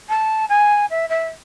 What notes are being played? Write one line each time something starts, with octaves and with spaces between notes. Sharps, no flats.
A5
G#5
E5
E5